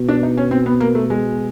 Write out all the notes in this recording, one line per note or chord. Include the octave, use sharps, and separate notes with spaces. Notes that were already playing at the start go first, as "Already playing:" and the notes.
Already playing: B2
D4
D#4
C#4
C4
B3
A#3
A3
G#3